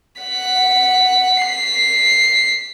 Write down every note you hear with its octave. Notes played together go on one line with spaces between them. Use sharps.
F#5 B6
B6 C7